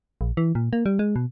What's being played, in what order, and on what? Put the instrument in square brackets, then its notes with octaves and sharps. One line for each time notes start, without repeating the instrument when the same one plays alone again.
[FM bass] A#1
E3
A#2
A#3
G3
G#3
B2